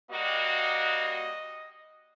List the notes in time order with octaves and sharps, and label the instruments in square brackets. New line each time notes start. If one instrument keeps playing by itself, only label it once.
[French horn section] G3 A#3 F#4 [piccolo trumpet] D#5